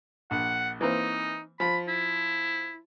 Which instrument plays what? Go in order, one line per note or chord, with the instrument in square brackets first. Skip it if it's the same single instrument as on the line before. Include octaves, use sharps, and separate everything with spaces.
[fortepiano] A#1 [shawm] F#5
[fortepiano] E3 A#3 C4 [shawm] D#4
[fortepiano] F3 [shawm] B5
[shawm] E4